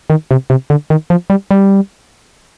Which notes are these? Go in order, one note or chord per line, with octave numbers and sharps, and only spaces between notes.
D#3
C3
C3
D3
D#3
F3
G3
G3